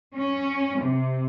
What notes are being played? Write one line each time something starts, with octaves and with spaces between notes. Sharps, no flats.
C#4
C3